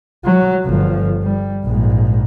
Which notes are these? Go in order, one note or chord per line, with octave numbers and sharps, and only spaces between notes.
F#3
G1 F3
G3
A#1 G#2